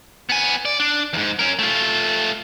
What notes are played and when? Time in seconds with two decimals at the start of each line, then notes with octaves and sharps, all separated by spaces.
0.29 B3 G#5
0.65 D5
0.79 D4
1.13 E2 G#2
1.39 C#4 A#4
1.59 A3 F4